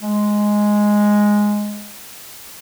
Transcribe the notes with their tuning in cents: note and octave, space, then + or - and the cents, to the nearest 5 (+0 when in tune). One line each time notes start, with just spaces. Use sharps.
G#3 +0